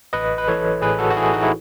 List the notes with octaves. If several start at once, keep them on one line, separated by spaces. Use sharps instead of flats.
A1 B4 D#5
B4
E3 A4 C#5
A2 G#4 B4
F#4 A4
F#4
E3 E4 G#4
D#4 F#4
E4